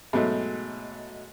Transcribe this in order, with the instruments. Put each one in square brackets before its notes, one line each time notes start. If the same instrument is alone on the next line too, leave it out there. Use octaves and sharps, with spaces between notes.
[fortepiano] G#2 B2 F#3 A3